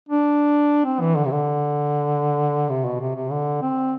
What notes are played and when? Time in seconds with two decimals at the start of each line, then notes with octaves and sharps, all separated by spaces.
0.09 D4
0.85 C4
1.01 E3
1.17 D3
1.25 C3
1.31 D3
2.70 C3
2.85 B2
3.00 C3
3.16 C3
3.31 D3
3.62 C4